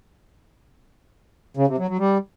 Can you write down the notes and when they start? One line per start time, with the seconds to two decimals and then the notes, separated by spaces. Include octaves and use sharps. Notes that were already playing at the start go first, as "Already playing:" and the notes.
1.57 C#3
1.67 C3
1.78 F#3
1.88 F#3
1.99 G3